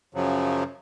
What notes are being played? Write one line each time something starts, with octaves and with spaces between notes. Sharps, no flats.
F#2 C#3 F3 F#3